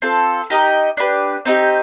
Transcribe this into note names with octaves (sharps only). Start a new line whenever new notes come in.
C4 F4 A4
D#4 G4 A#4 D#5
D4 G4 B4
C4 D#4 G4